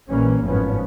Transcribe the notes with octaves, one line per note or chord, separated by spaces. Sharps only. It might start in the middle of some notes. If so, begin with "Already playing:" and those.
A#1 A#2 E3 G3 A#3 C#4
G#1 F#2 A2 F3 B3 C#4